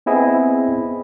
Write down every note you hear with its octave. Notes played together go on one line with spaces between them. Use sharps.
B3 C4 E4 G#4 D#5